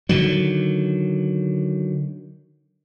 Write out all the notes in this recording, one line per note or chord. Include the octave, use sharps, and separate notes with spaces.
D3 D#3 F#3